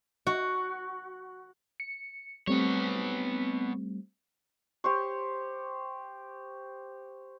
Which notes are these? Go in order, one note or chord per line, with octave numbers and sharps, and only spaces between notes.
F#4
C#7
G3 A3 B3 C4 C#5
G4 C5 C#6